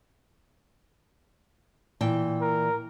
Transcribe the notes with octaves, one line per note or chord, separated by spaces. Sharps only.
A#2 E3 G5
A#4